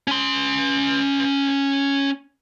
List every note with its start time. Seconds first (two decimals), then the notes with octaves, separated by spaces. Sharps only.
0.08 C#4 C6